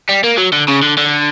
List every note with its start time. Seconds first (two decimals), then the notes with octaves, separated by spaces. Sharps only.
0.09 G3
0.24 A#3
0.38 F#3
0.53 D3
0.68 C#3
0.83 D3
0.97 D3